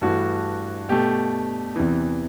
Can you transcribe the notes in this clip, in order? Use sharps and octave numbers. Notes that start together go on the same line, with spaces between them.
G2 E3 A3 F#4
B2 A3 G4
E2 C3 E3